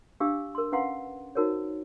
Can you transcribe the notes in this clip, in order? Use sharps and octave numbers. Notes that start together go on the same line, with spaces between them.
D4 G4 F5 D6 E6
A#4 C6
C#4 B4 F5 F#5 A#5 C6
D#4 F#4 A#4 C5 C#5